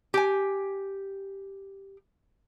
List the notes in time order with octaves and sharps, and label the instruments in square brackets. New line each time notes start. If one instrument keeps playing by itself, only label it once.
[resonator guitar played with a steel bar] G4 G#5